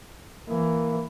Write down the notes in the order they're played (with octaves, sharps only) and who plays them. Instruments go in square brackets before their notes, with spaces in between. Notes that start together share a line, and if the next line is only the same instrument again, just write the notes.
[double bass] E3 [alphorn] A#3